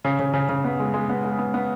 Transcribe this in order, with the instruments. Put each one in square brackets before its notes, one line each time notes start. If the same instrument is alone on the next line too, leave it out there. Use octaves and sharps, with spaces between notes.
[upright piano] C#3
C#3
C#3
C#3
B3
G#3
G#3
B3
G#3
B3
B3